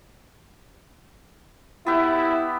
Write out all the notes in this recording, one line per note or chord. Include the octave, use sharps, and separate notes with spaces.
B3 E4 G4 E5